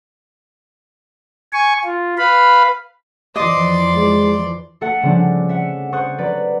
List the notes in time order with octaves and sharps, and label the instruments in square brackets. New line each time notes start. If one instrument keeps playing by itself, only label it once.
[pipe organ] G#5 C#6
F4
B4 F5 B5
[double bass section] F2 E3 F3 [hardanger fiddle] D5 C6 [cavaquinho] D#5 D6
[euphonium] G#3
[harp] A3 A4 E5 F#5
C#3 F3 G3 A3 C4 D4
E5 F#5
A4 C5 F#5 C#6 D#6 F#6
F#3 B4 D5